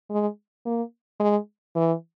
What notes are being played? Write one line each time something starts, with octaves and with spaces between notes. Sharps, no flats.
G#3
A#3
G#3
E3